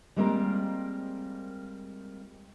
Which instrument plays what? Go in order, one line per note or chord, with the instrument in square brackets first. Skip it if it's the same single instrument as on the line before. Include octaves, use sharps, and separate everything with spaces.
[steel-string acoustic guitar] G3 G#3 A#3 C4 F4 A#4